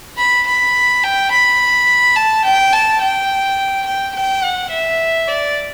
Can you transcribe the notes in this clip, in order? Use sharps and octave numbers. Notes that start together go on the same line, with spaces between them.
B5
B5
G5
B5
A5
G5
A5
G5
G5
G5
F#5
E5
D5